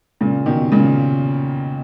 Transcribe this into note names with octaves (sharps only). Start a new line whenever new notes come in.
A#2 C#3
B2 D#3
A#2 C#3